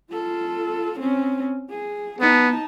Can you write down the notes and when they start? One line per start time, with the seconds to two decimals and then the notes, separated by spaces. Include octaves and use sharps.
0.12 F4 A4
1.00 C4 C#4
1.70 G#4
2.21 B3 D#4 A5